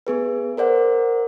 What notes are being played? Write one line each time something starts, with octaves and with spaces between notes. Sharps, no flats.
B3 G#4 B4
A#4 C5 D5 F#5